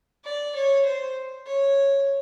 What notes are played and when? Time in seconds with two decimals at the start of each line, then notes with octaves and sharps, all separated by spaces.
0.25 D5
0.55 C#5
0.85 C5
1.46 C#5